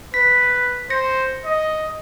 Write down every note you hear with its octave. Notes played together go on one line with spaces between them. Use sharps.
B4 B6
C5 A#6 C#7
D#5